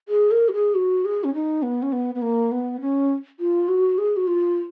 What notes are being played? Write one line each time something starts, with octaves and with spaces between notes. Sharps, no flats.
G#4
A#4
F#4
G#4
F#4
G#4
C#4
D#4
B3
C#4
B3
B3
A#3
B3
C#4
F4
F#4
G#4
F#4
F4